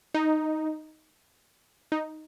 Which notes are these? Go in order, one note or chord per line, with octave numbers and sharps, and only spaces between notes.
D#4
D#4